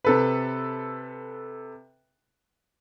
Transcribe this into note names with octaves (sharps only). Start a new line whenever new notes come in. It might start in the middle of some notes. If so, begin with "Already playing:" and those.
C3 A4 B4